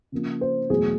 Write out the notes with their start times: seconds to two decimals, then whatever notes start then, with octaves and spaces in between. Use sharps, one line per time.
0.12 C#3 F3 A#3
0.41 C5
0.70 E2 B2 F#3 A3 G#4